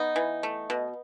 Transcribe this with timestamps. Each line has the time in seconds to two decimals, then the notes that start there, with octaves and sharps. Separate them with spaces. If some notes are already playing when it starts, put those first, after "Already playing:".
Already playing: B3 D#4
0.16 E3
0.43 A3
0.70 B2